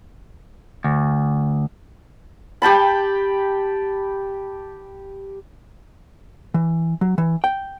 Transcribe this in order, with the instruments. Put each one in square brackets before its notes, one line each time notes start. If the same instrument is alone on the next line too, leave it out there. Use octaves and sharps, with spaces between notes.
[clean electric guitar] D2
[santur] G4 G5 A5 B5
[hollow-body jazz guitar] E3
F#3
E3
G5